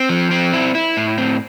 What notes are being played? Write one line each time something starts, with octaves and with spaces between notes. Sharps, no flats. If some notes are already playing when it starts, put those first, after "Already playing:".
Already playing: C4
F3
C4
E4
E4
A2
C4